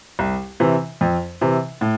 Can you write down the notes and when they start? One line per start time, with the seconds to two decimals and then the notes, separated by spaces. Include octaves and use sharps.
0.19 C2
0.60 C3 E3
1.01 F2
1.41 C3 E3
1.81 A2